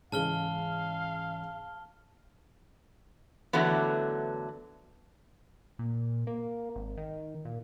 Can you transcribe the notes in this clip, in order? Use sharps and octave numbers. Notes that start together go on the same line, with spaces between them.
G#2 C#3 E3 G#3 F5 A5 F6 G7
D3 E3 F#3 A3 B3
A#2
A#3
G#1
D#3
A#2